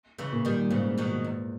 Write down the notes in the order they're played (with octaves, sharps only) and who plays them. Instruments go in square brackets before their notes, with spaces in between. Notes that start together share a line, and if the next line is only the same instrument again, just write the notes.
[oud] C#3 E3
[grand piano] A#2
[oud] D#3 G3
[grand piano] G#2 [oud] C#3 E3
[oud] B2 D#3
E2